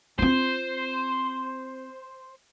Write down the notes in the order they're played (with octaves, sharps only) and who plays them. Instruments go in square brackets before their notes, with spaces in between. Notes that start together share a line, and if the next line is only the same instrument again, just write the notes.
[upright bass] C4 F4 [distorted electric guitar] C5